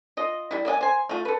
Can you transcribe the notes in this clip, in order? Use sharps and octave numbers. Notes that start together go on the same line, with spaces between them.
F4 D#5
G3 E4
A#3 D5 D#5 G#5
C5 G#5
A3 F4
A4 B4